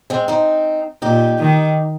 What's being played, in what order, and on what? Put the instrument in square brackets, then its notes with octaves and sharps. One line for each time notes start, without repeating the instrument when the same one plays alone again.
[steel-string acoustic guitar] G#3 C4
C4 D#4
[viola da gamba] A#2 [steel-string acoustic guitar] D#4 G4
[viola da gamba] D#3